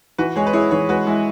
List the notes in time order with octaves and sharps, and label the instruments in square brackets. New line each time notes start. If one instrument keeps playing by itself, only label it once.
[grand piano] E3 [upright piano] F#4 B4
[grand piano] G#3 [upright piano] G#4 C#5
[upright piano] B4
[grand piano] E4 [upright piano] G#4 C#5
[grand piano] E3 [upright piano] G#4 C#5
[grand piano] G#3 [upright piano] F#4 B4
[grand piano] G#3 [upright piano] E4